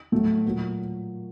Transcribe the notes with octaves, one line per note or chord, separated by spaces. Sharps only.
A2 F#3 A3
A#2 F#3 A#3